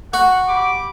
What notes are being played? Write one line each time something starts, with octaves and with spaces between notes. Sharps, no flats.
F#4 F#5
G4 B5 D6